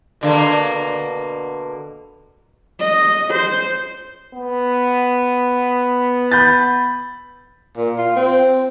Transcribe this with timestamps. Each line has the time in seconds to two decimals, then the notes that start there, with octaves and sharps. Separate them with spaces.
0.21 B2 D3 A#3
2.79 D#5
3.31 C5
4.35 B3
6.32 B5 G6 A6
7.78 A#2
7.98 F4
8.16 C4